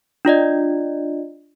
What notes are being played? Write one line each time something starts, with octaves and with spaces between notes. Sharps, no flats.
D4 F4 D5 D#5